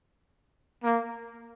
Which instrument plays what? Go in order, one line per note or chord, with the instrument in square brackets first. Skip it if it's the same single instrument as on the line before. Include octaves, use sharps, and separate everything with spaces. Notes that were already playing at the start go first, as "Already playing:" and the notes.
[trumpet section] A#3